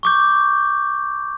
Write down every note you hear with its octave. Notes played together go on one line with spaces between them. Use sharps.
C#6 D6 G6